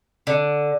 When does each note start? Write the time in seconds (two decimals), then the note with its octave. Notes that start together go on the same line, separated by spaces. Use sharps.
0.27 D3